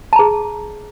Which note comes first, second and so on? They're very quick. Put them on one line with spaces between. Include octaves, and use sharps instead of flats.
A5 A#5 G#4